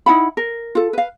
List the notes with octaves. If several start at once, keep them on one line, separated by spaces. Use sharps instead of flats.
D#4 E4 F#5 B5
A#4
F4 A4
B4 F5